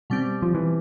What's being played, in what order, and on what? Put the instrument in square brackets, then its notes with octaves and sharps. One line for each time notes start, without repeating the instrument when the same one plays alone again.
[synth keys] B2 G3 C4
[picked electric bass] F3
E3